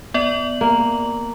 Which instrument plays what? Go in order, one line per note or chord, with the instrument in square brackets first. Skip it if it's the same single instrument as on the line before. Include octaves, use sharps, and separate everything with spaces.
[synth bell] B3 D5 F#7
[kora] A#3